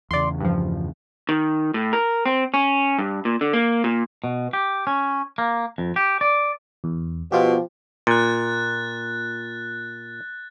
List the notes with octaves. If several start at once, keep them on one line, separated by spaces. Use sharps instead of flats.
E2 C#3 D5 C6
G2 F3
D#3
A2
A#4
C4
C#4
G2
A#2
D3
A#3
A#2
B2
G4
C#4
A#3
F2
G4
D5
E2
B2 F3 B3 F4 G4
A#2 F#6 A6